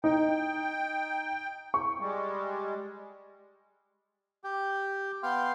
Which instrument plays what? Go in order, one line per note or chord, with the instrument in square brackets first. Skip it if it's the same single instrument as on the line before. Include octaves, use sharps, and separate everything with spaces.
[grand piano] D#4 [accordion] G5
[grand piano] C#6
[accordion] G3 G#3
[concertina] G4 G5
B3 F5 G5 C6